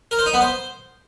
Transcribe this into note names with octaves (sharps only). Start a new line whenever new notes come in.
A#4
C5
D#4
B3
C5